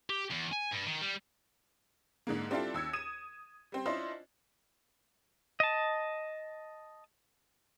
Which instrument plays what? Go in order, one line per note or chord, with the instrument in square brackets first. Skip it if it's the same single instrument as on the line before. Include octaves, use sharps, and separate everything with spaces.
[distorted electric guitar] G4
E2
G#5
G2
D#3
G3
[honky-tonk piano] G#2 D3 G#3 A#3
G3 C4 D4 E4 F4 A4
D#2 E6 G#6 C#7
D#6 G#6 D#7 E7
G3 C4
C#4 D4 E4 F4 C5 D#5
[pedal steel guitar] D#5 A5